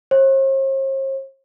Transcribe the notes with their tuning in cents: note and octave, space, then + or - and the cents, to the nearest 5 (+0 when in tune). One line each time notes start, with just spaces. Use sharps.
C5 +45